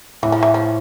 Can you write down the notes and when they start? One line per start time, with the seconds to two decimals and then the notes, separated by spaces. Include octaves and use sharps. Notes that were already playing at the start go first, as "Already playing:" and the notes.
0.23 A2 E3
0.32 F3
0.43 E3
0.54 F3